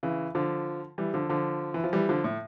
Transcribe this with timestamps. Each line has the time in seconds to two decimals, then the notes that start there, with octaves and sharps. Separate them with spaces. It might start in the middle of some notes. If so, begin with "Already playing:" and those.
0.03 C#3 E3
0.35 D3 F3
0.98 E3 G3
1.14 D3 F3
1.29 D3 F3
1.74 E3
1.84 F3
1.93 E3 G3
2.09 D3 F3
2.24 A2